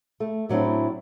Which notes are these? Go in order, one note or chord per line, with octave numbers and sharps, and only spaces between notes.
A3
A2 F#3 C4 D4 E4